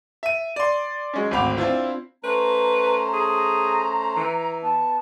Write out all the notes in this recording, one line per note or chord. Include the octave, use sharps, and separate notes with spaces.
E5 D#7
D5 C6
F#3 G#3 C#4
G#1 D2 C4 B5 D6 F7
C4 D4 E4 F4 C5
A3 C#4 B4 C5 A#5
G#4
A#5
E3
B3 A5